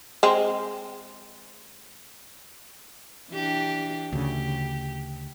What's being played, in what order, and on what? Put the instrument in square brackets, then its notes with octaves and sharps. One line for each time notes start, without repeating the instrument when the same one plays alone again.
[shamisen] G#3 C4
[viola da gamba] E3 D4 G4
[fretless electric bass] D2 C#3 [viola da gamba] G4